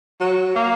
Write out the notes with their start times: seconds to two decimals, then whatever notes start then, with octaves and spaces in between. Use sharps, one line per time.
0.20 F#3
0.55 A#3